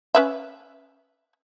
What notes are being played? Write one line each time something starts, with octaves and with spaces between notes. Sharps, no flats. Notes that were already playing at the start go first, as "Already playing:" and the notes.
C#4 B4 E5